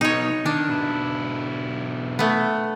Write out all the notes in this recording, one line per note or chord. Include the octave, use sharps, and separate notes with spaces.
B1 B2 D#4 C#5
D#3 D4
B1 E4
A3 B3